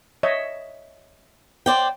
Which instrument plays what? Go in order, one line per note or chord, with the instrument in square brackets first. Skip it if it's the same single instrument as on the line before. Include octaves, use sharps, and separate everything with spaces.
[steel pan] C#5 D#5 E5
[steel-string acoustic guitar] C5 D5 G5